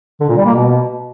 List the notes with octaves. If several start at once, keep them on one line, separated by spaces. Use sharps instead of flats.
D3
A#2
G3
A#3
B2